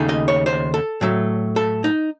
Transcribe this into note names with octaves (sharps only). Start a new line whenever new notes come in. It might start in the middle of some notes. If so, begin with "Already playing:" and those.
Already playing: D#2 C#3 A3 D#4
D#5
C#5
C5
A4
A2 F#3 A3
A4
D#4